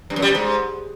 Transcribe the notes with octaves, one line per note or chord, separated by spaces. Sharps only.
G2
F#2
G3
B2
G#2